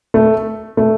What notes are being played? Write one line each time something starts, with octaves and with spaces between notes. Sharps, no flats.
A3
A3